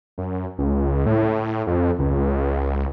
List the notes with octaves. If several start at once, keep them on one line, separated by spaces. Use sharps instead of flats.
F#2
C#2
A2
F2
C#2